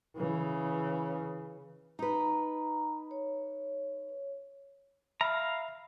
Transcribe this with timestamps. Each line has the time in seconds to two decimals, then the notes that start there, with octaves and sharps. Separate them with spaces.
0.16 C#3 E3
1.99 D#4 B4 A#5
3.11 C#5
5.21 E5 F5 A#5 B5 F6